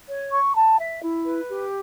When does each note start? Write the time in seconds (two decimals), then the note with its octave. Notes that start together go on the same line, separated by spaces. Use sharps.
0.09 C#5
0.31 C#6
0.55 A5
0.79 E5
1.02 E4
1.26 B4
1.49 G4